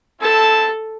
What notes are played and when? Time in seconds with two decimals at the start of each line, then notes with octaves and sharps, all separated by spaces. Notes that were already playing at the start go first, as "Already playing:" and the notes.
0.21 C4 E4 A4 A5